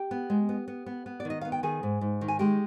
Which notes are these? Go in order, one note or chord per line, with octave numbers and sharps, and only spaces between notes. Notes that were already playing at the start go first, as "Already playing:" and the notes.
Already playing: G4 G5
B3
G#3
B3
B3
B3
B3
D5
D#3
D#5
B3 F5
G5
D#3 G#4 G#5
G#2
G#2
D#3
G#5
G#3 G4 G5